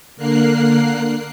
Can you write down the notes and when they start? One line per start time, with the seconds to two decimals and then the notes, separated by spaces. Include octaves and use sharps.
0.16 D3 A#3 A#4 F#6 C7